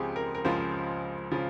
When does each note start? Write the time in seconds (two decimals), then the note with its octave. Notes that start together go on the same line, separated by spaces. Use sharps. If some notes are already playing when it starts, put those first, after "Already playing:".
Already playing: C#2 C#3 F3 C4 G4 G#4
0.16 A#4
0.35 A#4
0.45 C#2 C#3 F3 C5
1.31 C#3 F3